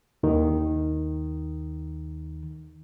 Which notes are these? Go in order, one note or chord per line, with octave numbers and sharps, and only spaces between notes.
D#2 D#3